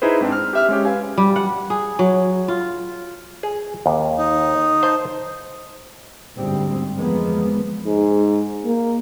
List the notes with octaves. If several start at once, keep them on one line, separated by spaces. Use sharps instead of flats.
D#4 E4 G#4 B4 C5
G#2 C4 D4
F6
G4 E5 F6
G#3 C#4 G4
B4 F5 G#5
G3
F#5
G#4
F#3
F4
G#4
D#2
D#4
C5 A5
G1 D2 G#2 G3 C4
F2 E3 F3 G#3 A#3 B3
G#2
A#3